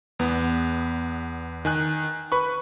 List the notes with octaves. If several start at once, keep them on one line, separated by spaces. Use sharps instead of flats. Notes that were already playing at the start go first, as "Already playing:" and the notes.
E2 B3
D#3 G#5 F#6
B4 B5 C#6